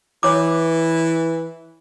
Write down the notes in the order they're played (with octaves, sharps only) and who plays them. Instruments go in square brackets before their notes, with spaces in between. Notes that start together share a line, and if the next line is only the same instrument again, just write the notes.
[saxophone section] E3 [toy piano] C#5 D6